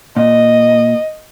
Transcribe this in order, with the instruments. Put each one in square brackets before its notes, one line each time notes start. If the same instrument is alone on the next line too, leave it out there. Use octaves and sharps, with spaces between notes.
[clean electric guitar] A#2 [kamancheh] D#5